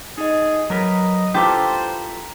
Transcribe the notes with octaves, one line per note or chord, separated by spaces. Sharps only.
D#4 G#4 D#5
F#3 A#4 B4 D#5 A#5
E4 F4 G4 A4 B4 C5 A#5